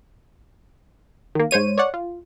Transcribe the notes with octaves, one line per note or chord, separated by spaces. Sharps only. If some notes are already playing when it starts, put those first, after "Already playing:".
D#3 A#3
G#2 C5 C#5 D#7
C#5 D5 F#5
F4